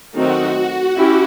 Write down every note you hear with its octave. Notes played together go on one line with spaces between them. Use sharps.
D#3 F#3 A3 C4 D#4 F#4
C#4 E4 G4